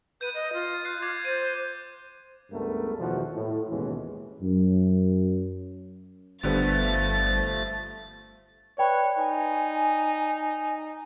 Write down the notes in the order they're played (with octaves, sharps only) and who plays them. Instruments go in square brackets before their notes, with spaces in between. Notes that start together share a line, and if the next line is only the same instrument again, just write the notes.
[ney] B4 [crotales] G6 D#7
[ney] D#5
F4
[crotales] F#6 C7
D6 G#6 A6
[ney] C5 [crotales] A6 D#7
[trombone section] C#2 G2 G#3 A3 B3 A#4
E2 B2 D#3 F3 F4 F#4
A2
D#2 G#2 B2 E3 G#3 C#4
[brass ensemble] F#2
[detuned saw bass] G1 [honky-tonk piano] D3 G3 B3 [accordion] F3 A3 [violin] A6
[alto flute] B4 [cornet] C#5 [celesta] D5 G5 B5
[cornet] D#4 [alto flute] G#5